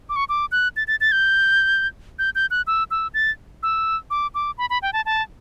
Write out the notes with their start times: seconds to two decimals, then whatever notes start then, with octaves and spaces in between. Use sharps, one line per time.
0.09 D6
0.16 C#6
0.29 D6
0.52 F#6
0.76 A6
0.88 A6
1.01 A6
1.12 G6
2.19 G6
2.35 G6
2.51 F#6
2.67 E6
2.91 E6
3.14 A6
3.63 E6
4.10 D6
4.34 D6
4.58 B5
4.70 B5
4.82 G5
4.93 A5
5.06 A5